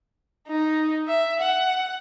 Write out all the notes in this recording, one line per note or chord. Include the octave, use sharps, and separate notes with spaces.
D#4
E5
F#5